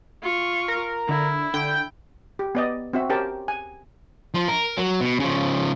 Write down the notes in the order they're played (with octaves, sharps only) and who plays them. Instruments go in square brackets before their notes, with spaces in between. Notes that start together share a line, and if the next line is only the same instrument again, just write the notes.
[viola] F4 C#6
[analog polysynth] A#4
[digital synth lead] D3 [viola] E4
[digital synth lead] D3 [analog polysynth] G5
[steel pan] G4
B3 D5 D#5
C4 F#4 E5
C#4 G4 A#4 C5 G5 A5
G#5
[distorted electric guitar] F3
A#4
F#3
B2
C#3 F3